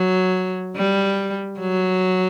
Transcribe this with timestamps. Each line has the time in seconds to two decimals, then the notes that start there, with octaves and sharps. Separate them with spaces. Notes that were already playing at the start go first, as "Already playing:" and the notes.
Already playing: F#3
0.76 G3
1.59 F#3